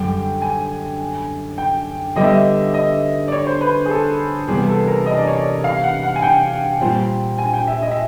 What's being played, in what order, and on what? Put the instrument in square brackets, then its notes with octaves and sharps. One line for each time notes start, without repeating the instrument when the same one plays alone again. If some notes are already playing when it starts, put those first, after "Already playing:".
Already playing: [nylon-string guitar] F#2 D3 G3 [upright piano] G5
[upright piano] G#5
G5
[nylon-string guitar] D3 G3 B3 [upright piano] D#5
[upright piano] E5
D#5
D#5
D5
C#5
C5
B4
G#4
A4
[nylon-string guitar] C3 E3 G3 B3 [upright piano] G#4
[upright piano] A4
A#4
D#5
D5
C#5
D5
F5
F#5
F#5
G#5
G5
[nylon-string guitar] A#2 G3 C4 F4
[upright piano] G#5
G5
E5
D#5
E5